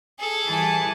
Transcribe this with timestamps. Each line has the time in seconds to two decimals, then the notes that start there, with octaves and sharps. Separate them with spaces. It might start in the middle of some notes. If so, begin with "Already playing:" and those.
0.19 G#4 A4
0.47 E3 G3 G#5 A5 B5